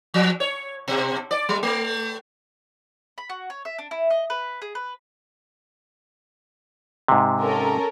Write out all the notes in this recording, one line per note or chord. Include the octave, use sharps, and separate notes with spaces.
F3
C#5
B2
D5
G3
A3
B5
F#4
C#5
E5
D4
E4
D#5
B4
G#4
B4
G#2 C3
C#4 A4 A#4